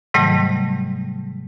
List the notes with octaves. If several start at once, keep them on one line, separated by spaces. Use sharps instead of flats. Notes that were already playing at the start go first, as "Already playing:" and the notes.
G#2 C3 D#3 F#3 G3 A3